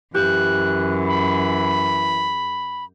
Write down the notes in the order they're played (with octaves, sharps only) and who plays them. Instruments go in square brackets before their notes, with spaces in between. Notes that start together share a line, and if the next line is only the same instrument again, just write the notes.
[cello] F#2 [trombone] E3 [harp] G4 [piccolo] F#6
[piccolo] B5